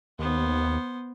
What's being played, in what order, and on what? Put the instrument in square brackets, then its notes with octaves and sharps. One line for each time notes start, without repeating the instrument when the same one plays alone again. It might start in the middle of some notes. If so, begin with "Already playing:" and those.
[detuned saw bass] D#2 [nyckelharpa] B3 C5